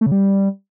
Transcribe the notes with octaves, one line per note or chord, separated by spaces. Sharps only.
A3
C#3
G3